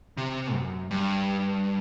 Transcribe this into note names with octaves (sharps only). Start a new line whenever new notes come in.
C3
F#2
G2